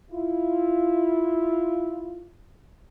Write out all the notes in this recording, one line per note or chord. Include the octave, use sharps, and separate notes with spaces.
E4 F4